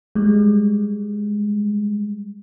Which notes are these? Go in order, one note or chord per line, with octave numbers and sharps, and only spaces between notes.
G3 G#3